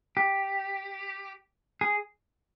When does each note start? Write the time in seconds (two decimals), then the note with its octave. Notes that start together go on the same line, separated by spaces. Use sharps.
0.17 G4
1.81 G#4